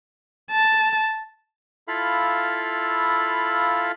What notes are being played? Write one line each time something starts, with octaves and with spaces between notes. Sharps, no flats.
A5
E4 F4 A4 F5 B5